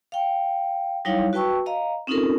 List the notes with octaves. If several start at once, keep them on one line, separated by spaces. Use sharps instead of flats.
F5 G5
F#3 G3 D#4 E4 C#5 F5
F#4 B4 G5 A5 C#6 E6
D#5 F5 A#5
C4 C#4 D#4 F4 A4 A#4